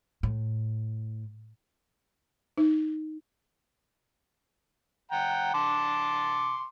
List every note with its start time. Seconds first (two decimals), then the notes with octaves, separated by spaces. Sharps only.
0.23 A2
2.58 D#4
5.12 F#5 G5 A#5
5.54 A5 C6 D6